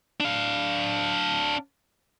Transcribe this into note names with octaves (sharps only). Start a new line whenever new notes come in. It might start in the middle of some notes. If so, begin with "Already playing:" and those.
D4 F5